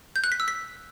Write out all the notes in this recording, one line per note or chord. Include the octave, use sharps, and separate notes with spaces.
G6
F#6
B6
E6
B6